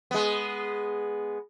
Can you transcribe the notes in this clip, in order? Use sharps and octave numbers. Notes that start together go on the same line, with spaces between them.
G#3 B3